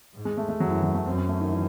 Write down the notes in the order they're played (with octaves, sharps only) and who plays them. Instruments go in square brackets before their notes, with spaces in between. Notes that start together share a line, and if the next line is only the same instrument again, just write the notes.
[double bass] G#2
[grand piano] G#3
A3
A3
[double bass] F#2 [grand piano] F#3
[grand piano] E3
F#3
A3
[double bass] F#2 [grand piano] C4
[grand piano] C#4
A3
D#3
E3